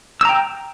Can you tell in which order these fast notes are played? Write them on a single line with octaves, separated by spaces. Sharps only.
E6 A#5 G5